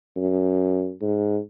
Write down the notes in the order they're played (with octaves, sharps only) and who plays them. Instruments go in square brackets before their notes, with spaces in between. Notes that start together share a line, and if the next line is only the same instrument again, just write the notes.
[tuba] F#2
G#2